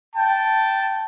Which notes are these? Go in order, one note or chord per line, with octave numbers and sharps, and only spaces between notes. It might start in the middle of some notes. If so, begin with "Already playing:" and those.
G5 A5